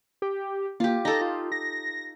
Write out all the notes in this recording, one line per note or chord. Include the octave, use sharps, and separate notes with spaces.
G4
A#3 F4 G4
D#4 A4 A#6
F4
A#6